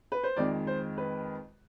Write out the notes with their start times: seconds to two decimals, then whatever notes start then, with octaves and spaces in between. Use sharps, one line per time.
0.12 B4
0.24 C5
0.37 F2 D#3 G#3 D5
0.67 C5
0.98 B4